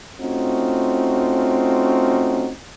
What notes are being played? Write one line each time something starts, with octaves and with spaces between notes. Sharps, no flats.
A3 C4 C#4 D#4 F4 F#4